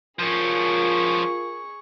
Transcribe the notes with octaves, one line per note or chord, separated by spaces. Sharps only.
F3 C#4 F4 G#4 A#4 C#6